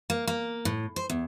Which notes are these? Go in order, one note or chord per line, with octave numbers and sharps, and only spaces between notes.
A#3
A#3
A2
C5
E2